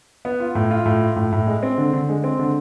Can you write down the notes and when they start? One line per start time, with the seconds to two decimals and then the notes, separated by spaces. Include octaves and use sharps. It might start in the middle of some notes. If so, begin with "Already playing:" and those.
0.25 B3
0.40 F4
0.55 A2
0.71 F4
0.86 A2
1.01 F4
1.16 A2
1.32 A2
1.47 G#3
1.63 C4
1.78 D3
1.93 D3
2.09 G#3
2.24 C4
2.39 D3